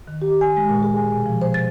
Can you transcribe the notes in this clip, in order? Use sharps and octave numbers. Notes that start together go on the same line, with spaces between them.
D#3
G4
G#5
G#3
A#2
G#4
G#5
B2
F3
C5
A6